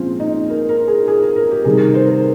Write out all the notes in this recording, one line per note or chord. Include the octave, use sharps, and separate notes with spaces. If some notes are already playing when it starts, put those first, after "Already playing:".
Already playing: A#2 F3 G#3 C4 C#4 F4
D#4
A#4
A#4
G#4
G#4
A#4
A#4
G4
C3 D#3 G3 G#4
A#4
C5
A#4